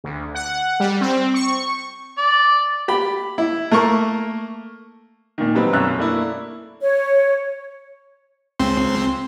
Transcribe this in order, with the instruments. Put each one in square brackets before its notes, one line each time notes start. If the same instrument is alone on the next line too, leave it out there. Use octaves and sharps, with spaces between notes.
[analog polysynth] D2
F#5
G3
C4
C#6
[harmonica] D5
[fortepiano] G4 B5
E4
A3 A#3 A#4 C#6
[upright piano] A#2 D#3
F#3 G3 C4 D#4 B4
B1 F#2 C#4 C#5 E6 F#6
A3 A#3 D4 E4
[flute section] C#5
[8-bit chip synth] C#2 C4 C6